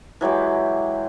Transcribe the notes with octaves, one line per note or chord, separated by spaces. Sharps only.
E3 F#3 G#3 G4